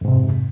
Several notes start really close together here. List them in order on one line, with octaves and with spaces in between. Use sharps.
F2 G#2 C3